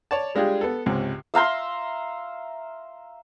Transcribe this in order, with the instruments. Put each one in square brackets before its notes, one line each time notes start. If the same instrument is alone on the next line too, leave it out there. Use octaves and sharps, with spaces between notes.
[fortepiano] C#5 D5 A5
G3 G#3 D4 F4 G4 G#4
B3 A4
C#2 G#2 C3
[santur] E5 F5 A#5 C6